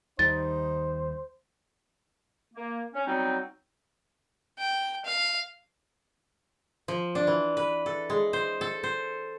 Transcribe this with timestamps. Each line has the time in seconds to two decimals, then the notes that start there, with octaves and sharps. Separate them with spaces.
0.19 D#2 D#3 G3 D#4 C5 A6
2.54 A#3
2.94 C#4
3.07 F#3 G3 B3 C4 D#4
4.58 G5
5.05 F5
6.88 F3
7.15 D4
7.27 E3
7.57 B4
7.86 A4
8.10 G#3
8.33 C5
8.61 A4
8.83 C5